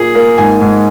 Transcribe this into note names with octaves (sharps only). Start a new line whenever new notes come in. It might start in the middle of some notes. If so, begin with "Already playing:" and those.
Already playing: A#2 A#3 G#4
A#3
G#2 G#5
G#2